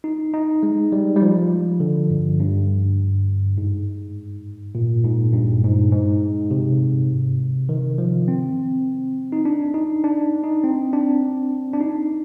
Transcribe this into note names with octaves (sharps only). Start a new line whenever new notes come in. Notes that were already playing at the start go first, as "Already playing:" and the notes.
D#4
D#4
G#3
G3
G3
F3
D3
G2
G2
G#2
A#2
G#2
G2
G#2
G#2
C3
D#3
F3
C4
D#4
D4
D#4
D4
D#4
C4
D4
D4
D#4